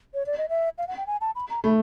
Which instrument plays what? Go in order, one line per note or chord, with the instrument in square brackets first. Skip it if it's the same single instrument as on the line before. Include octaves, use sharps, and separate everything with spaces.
[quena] C#5
D5
D#5
E5
F5
F#5
G5
G#5
A5
B5
A#5
[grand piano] A3 [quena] B5